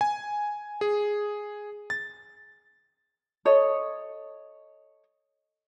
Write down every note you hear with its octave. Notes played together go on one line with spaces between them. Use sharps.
G#5
G#4
A6
A4 C#5 D#5